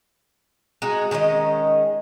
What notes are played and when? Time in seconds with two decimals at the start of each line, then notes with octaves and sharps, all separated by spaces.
0.82 G#3 D#4 F#4
1.11 D#3 G#3 C#4 D#5